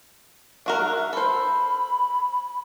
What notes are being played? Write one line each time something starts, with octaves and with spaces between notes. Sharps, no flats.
D4 F#4 A#4 E5
A4 C5 B5